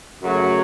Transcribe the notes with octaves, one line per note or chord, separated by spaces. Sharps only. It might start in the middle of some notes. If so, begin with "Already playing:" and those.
F#2 C#3 F#3 A3